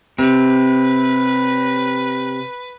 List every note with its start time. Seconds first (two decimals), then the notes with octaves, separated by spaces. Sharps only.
0.19 C3 B4